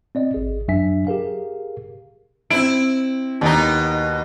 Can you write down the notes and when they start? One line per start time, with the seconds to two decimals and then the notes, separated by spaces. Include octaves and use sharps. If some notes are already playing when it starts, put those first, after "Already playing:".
0.15 C4 D5 D#5
0.34 G#1 G#4
0.68 F#2 F#3 D4 E5 G#5 B6
1.07 G4 G#4 A#4 F5
2.50 C4 E4 D7
3.41 D#2 B2 D#4